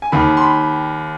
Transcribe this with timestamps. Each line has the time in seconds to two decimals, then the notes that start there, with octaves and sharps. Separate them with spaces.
0.02 G#5
0.12 D#2 D#3 B5
0.37 C6
0.42 B5